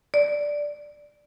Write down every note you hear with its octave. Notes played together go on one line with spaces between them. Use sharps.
D5